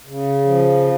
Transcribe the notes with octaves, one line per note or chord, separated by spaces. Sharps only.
C#3
F3